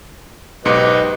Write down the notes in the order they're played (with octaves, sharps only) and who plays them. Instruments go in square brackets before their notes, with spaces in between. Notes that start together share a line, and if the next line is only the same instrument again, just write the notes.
[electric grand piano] B1 G#2 C#7 [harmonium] G4 B4 D#5